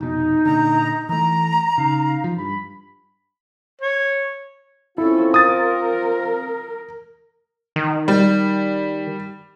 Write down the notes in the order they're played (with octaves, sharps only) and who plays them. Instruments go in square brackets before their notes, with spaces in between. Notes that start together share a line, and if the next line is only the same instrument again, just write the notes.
[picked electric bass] F1 B2 [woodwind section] D#4
[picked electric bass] A#2 D3 [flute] A#5
[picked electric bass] E3 A3 [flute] A#5
[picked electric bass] C#3 [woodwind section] D#4 F5
[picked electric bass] F3
[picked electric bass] G2 [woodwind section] B5
[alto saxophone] C#5
[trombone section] C4 F4 [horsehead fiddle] C#4 A4 [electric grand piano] E4
[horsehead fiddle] A#4 [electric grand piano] D#6 A6
[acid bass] D#3
[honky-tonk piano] G3